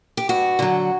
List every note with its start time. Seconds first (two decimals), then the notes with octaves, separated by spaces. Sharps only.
0.17 G4
0.29 G2 F#4
0.59 D3 F#3